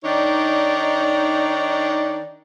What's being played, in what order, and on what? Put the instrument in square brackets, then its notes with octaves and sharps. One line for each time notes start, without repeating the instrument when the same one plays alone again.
[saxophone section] D#3 D4 D#4 C#5 D5